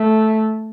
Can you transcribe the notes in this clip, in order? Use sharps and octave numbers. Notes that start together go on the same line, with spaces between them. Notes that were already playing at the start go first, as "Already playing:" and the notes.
Already playing: A3